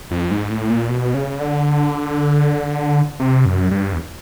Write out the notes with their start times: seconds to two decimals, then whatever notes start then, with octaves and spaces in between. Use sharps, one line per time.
0.11 F2
0.31 G#2
0.50 A2
0.70 A#2
0.89 B2
1.14 C#3
1.40 D3
3.20 C3
3.45 F#2
3.71 G2
3.93 E2